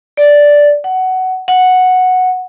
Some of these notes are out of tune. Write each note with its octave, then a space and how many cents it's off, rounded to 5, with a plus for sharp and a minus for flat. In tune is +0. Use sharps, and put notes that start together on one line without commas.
D5 -5
F#5 +15
F#5 -5